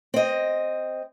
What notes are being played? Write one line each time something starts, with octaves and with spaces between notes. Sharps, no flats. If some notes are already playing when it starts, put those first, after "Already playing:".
C4 D#5